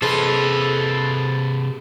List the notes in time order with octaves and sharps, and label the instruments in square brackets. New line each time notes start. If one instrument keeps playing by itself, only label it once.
[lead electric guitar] C3 B4 [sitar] G#4 [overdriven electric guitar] A4 C5